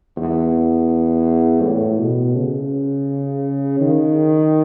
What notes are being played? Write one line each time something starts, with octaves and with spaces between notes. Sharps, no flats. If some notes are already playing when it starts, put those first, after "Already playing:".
E2
A2
B2
C#3
D#3